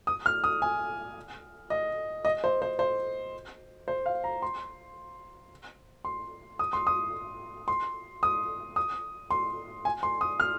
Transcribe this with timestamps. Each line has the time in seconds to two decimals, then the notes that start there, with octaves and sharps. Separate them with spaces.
0.07 D#6
0.26 F6
0.44 D#6
0.62 G#5
1.70 D#5
2.25 D#5
2.44 C5
2.62 C5
2.79 C5
3.88 C5
4.06 F5
4.24 A#5
4.42 C6
6.05 C6
6.59 D#6
6.73 C6
6.87 D#6
7.68 C6
8.23 D#6
8.76 D#6
9.31 C6
9.85 G#5
10.03 C6
10.21 D#6
10.40 F6